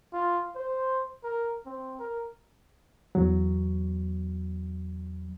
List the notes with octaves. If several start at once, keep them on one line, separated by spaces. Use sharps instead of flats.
F4
C5
A#4
C4
A#4
E2 F#3